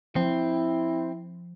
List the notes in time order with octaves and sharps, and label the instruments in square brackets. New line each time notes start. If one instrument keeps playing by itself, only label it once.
[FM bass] F3 [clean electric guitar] C4 [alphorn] E4